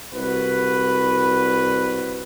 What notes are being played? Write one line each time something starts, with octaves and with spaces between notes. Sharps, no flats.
C2 F#4 B4